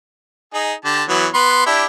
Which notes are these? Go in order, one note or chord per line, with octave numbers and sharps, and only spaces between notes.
D#4 G#4
D3 G4 A5
E3 F#3 B3
B3 B4 C6
D4 E4 G4